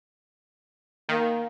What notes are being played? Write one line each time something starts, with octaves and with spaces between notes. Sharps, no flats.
D#3 A#3